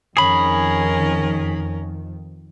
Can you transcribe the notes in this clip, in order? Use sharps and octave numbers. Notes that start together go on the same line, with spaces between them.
F2 D#3 C#4 G#4 A#4 B5